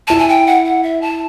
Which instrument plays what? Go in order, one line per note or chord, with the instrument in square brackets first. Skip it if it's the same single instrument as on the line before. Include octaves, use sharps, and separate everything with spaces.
[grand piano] E4 [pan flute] A5
[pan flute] G#5
G5
F#5
F#5
E5
A5